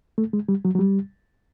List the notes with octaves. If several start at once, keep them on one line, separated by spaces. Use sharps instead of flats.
A3
G#3
G3
F#3
F#3
G3